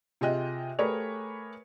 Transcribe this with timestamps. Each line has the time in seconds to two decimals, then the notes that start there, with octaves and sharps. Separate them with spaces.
0.21 C3 F4 G#4 D#5 G5 F#6
0.79 A3 G4 G#4 A#4 B4 C#5